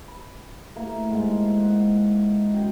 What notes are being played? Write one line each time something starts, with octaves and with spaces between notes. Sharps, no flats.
B5
A3 A#3 E4
G#2 G#3
F#5
F#2 G5